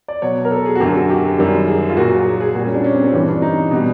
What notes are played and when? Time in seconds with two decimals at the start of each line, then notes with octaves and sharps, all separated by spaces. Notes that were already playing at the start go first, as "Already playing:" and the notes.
0.08 D5
0.22 B2 F#3 C#5
0.45 A#4
0.51 A4
0.66 G#4
0.75 F#4
0.80 F#2 D3 F#3 G4
0.95 F#4
1.09 G4
1.38 F#2 D#3 G3
1.68 G#4
1.89 F4
1.97 A#2 F#3 F#4
2.26 G#4
2.40 G#4
2.55 A#2 F#4
2.59 G3
2.65 C#4
2.74 D4
2.84 C#4
2.94 C4
3.04 C4
3.13 G2 E3 G3 C#4
3.28 D4
3.42 D#4
3.71 B2 G3